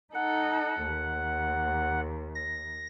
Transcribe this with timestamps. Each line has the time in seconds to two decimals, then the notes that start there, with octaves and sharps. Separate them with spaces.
0.15 D#4 A4 F#5
0.84 D#2
2.35 A#6